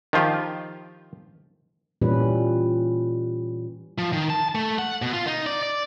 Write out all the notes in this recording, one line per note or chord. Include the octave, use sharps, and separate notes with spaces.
D#3 F3 F4 G4
A#2 E3 G3 C#4 B4
F3
D#3
A5
A3
F#5
B2
F4
D#4
D5
D5